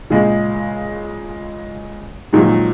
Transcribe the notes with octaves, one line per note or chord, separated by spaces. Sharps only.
A#2 C#3 G#3
A#2 D#3 F3 F#3 G#3